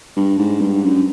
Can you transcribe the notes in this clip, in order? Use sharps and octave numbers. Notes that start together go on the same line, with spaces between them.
G2
G#2
G2
F#2